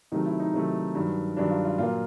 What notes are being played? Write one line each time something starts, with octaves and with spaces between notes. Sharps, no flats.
C3 D#3 F#3 A3 D#4
E4
D#4
C3 D#3 F#3 A3
G2 D#3 F#3
G2 D#3 F#3 D4
F4
F4
A#2 F#3 A#3 F4